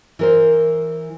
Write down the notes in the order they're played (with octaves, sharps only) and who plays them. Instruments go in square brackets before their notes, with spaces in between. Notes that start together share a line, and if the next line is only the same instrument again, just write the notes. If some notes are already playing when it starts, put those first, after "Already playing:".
[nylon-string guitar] E3 A#4 C5